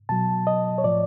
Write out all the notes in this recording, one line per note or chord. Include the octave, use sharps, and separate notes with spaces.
B2 F#3 A5
D#5
C#5
A2 F3 D5